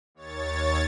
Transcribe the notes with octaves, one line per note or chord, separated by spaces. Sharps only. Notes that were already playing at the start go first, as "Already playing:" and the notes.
D#2 C#5 A6